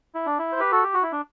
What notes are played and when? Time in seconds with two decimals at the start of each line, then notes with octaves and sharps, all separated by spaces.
0.15 E4
0.26 D4
0.39 E4
0.52 C5
0.60 G4 B4
0.72 F#4 A4
0.83 G4
0.94 F#4
1.03 E4
1.12 D4